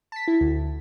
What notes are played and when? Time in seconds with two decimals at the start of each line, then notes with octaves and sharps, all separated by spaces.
0.12 A5 B6
0.28 E4
0.41 D2